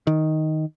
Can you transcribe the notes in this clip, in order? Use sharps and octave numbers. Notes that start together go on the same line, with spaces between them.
D#3